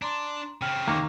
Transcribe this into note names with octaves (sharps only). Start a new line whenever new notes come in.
D4 A#5 C6
C#3 C4 G5 F6 F#7
D#2 A#3